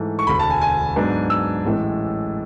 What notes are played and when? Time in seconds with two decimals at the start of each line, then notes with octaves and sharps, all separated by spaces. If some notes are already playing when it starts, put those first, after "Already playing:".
Already playing: G#2 E3 A3
0.19 C#6
0.27 E1 D2 D3 B5
0.39 A5
0.50 G#5
0.61 G#5
0.96 G#2 F#3 B3 D4
1.30 E6
1.65 A1 A2 E3 G#3